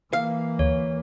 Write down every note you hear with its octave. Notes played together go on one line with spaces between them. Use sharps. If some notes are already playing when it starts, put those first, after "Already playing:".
E3 A#3 F5
D2 C#5